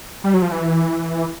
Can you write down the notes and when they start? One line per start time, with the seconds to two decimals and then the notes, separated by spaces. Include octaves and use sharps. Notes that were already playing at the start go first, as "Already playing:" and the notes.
0.24 G3
0.34 F#3
0.42 F3
0.51 E3